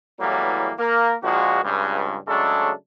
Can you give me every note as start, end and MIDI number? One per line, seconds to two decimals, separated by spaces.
0.20 0.71 45
0.20 0.71 52
0.20 0.71 54
0.20 0.71 55
0.20 0.71 58
0.20 0.71 59
0.79 1.14 58
0.79 1.14 70
1.23 1.60 34
1.23 1.60 46
1.23 1.60 53
1.23 1.60 56
1.23 1.60 66
1.64 2.16 37
1.64 2.16 43
2.28 2.71 49
2.28 2.71 54
2.28 2.71 56
2.28 2.71 57
2.28 2.71 62
2.28 2.71 69